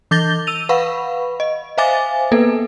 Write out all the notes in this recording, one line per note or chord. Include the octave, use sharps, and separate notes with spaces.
E3 D6 G6 A6 A#6 G7
E6 D#7 F7
B4 F5 F#5 B5 C#6
D#5
C5 E5 F5 G#5 D6 A6
A#3 B3 A4 B4